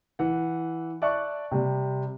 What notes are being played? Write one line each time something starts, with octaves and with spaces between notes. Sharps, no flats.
E3 F#5
D5 E5 A5 C#6 F#6
C3 G3